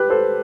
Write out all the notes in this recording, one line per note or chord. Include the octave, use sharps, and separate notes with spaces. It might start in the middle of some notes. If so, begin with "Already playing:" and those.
Already playing: G4 B4
A4 C5